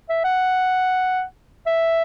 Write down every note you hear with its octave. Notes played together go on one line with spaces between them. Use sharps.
E5
F#5
E5